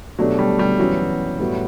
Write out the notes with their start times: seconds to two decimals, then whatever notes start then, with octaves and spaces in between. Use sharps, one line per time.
0.19 B2 F#3 A3 D4 G4
0.39 G3
0.59 G3
0.79 F#2 E3 F#3 B3
1.39 A2 G3 B3 F#4